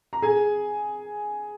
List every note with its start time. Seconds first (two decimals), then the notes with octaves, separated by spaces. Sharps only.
0.13 A#5
0.22 G#4 G#5